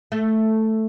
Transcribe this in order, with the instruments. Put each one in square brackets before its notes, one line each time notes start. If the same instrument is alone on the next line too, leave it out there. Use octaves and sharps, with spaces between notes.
[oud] A3